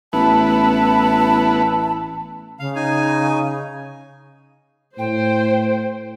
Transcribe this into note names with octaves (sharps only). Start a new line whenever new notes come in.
A1 B3 E4 A5
C#3 F5
D#4 G#5
A2 C5 G5